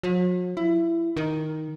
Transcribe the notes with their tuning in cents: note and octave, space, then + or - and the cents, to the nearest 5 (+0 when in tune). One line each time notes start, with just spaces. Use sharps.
F#3 -45
E4 +20
D#3 +5